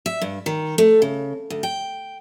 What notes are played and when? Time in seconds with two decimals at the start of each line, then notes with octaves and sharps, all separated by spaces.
0.06 E5
0.22 G2
0.46 D#3
0.78 A3
1.02 C#3
1.50 D2
1.63 G5